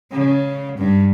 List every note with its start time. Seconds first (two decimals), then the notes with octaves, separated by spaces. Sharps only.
0.11 C#3
0.78 G2